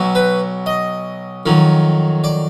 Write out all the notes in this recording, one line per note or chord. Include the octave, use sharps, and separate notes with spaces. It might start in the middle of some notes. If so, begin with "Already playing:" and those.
Already playing: B1 B2 F#3
B4
D#5
F2 D#3 F#3
D5